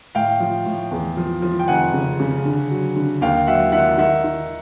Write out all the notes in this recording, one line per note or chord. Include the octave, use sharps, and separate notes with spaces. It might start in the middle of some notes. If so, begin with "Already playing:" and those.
A2 F5 G5
F3
A2
E2
F3
F3
G5
F1 F#5 G#5
C#3
C#3
D3
F#3
D3
D#2 F5 G5
F#3 E5 F#5
D#3 E5 F#5
D#3 E5 F#5
D#3